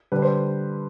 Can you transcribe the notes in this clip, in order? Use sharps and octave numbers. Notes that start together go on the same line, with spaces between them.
D3 G3 B4
C5